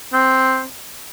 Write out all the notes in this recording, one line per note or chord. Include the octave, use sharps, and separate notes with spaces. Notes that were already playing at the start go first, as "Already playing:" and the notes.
C4